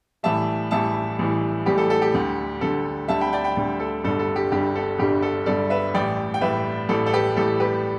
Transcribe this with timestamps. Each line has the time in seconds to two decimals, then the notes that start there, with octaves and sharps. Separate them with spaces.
0.23 A1 A2 E3 G3 E5 A5
0.71 A1 A2 E3 G3 E5 A5
1.19 A1 A2 E3 G3
1.66 A1 A2 E3 G3 G4
1.78 A4
1.90 A4
2.02 G4
2.14 D2 D3 G3
2.61 D2 D3 G3 A4
3.08 D2 D3 G3 E5 A5
3.21 G5 B5
3.33 D5 G5
3.44 G5 B5
3.57 D2 D3 G3
3.80 A4
4.04 G1 G2 D3 G3 A4
4.19 A4
4.36 G4
4.52 G1 G2 D3 G3 G4
4.75 A4
4.98 G1 G2 D3 G3 G4
5.22 A4
5.46 G1 G2 D3 G3 A4 D5
5.70 B4 E5
5.94 A1 A2 G3 D5 G5
6.34 G5
6.41 A1 A2 G3 B4 E5
6.89 A1 A2 G3 A4
7.06 A4
7.13 G4 B4
7.37 A1 A2 G3 A4
7.60 G4 B4